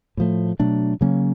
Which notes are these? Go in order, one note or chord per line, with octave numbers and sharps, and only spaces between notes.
A2 F3 A3
B2 F#3 A3 D4
C#3 F#3 A#3 C#4